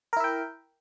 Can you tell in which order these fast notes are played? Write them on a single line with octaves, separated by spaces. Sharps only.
A#4 E4 E5 G5